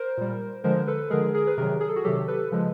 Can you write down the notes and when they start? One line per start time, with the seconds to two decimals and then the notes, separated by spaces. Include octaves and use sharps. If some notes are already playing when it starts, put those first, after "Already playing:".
Already playing: A#4 C5
0.17 A#2 G3
0.64 D3 F3 G#3 A#4 C5
0.87 A4 B4
1.10 D3 F3 G#3 G#4 A#4
1.34 G#4 A#4
1.47 B4
1.57 C3 D#3 F#3 G#4 A#4
1.80 G#4
1.88 A4
1.96 F#4 G#4
2.04 C3 D#3 F#3 G4 A4
2.28 A4 B4
2.51 C#3 F3 G#3